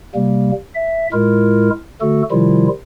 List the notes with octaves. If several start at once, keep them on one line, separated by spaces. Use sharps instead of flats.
C3 G3 A#3
E5
A2 G#3 E4 F4 A#4
D3 A3 F#4 A4
C3 D#3 F3 G3 E4 F4